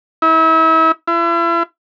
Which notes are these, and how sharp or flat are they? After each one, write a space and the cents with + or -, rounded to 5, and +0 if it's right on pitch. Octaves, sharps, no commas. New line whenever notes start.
E4 -35
E4 +40